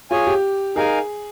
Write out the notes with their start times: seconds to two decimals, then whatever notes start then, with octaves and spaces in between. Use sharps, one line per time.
0.11 F4 G#4 C#5 G#5
0.27 G4
0.76 D#4 G#4 A#4 F5 G#5